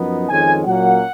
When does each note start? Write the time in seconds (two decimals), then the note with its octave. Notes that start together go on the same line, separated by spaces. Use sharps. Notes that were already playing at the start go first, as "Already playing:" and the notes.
Already playing: F#2 F3 B3 D#4
0.29 F2 D#3 G#3 C#4 G#5
0.65 A#2 F#3 A#3 C#4 F#5